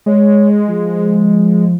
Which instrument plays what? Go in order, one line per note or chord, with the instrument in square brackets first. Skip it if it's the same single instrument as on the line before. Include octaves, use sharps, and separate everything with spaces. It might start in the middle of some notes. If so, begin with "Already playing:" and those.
[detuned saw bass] G#3 [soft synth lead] C#5
[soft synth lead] F3